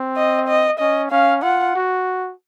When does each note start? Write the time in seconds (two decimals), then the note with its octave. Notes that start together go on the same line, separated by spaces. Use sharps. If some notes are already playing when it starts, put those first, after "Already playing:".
Already playing: C4
0.17 D#5
0.48 D#5
0.79 C#4 D#5
1.11 C#4 F5
1.43 F4 F#5
1.75 F#4